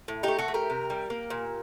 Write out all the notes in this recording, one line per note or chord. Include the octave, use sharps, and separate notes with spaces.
A2
A3 D#4 G4
F#4 A4
A3
G4 A#4
C3
G3
A#3
A#2